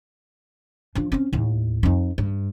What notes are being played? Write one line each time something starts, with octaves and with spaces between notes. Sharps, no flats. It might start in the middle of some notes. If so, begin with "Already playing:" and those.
F3 D4
C4 C#4
D#2 A2
F2 D#4
G2